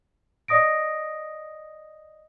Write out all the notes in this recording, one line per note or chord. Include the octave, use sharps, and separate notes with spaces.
D5 D#5 D#6 A#6 D7